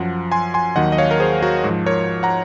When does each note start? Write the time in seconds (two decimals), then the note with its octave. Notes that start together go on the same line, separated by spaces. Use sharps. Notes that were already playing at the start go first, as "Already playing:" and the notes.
Already playing: F#2 F3 F#5
0.32 G#5 C6
0.54 G#5 C6
0.76 D#2 D#3 F#3 D#5 F#5
0.92 D#5
0.98 C#5 F5
1.11 A#4
1.20 G#4 C5
1.42 F#4 A#4
1.64 G#2
1.69 F3
1.86 A#4 C#5
2.23 F#5 A#5